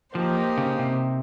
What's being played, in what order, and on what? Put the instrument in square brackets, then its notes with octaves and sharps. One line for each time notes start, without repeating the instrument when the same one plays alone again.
[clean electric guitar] F3 [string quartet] A#3 D#4 G4 C5
[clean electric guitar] C#3
C3